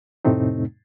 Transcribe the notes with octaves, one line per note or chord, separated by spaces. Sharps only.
F2 A2 C3 A3 C4 D#4